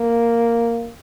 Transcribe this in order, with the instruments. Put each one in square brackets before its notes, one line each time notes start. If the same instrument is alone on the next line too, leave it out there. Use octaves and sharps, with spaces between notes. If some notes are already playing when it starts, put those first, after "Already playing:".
Already playing: [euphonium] A#3